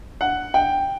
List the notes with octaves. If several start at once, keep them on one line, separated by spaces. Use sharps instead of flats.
F#5
G5